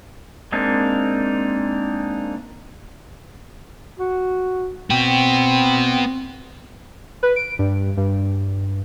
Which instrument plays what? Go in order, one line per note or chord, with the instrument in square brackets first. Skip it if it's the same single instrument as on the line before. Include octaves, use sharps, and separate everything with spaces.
[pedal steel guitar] G#3 A#3 C4 D4 D#4
[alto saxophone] F#4
[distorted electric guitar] B3 F#4 [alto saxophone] C4 [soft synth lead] G5
[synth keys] B4
D7
G2
G2